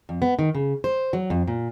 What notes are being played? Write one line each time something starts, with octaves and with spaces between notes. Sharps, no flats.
F2
B3
D#3
C#3
C5
F#3
F2
A#2